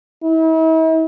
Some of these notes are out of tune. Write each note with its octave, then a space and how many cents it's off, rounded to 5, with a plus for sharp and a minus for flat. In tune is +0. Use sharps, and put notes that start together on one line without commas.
E4 -45